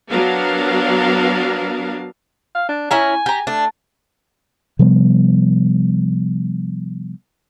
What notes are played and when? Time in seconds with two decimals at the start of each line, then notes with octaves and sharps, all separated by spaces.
0.12 F#3 B3 D4 A#4 F5
2.55 F5
2.69 D4
2.91 C#4 E4 G#5 A#5
3.26 G4 A#5
3.47 A3 D4
4.79 C3 F3 G3 B3